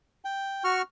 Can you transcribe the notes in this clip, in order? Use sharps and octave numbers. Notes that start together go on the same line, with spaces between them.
G5
F#4 C#6 F6